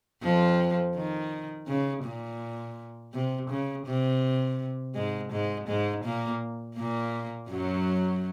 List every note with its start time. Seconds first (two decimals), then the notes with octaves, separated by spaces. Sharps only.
0.23 F2 F3
0.95 D#3
1.68 C#3
2.04 A#2
3.14 C3
3.50 C#3
3.87 C3
4.95 G#2 G#3
5.32 G#2 G#3
5.68 G#2 G#3
6.04 A#2 A#3
6.77 A#2 A#3
7.50 F#2 F#3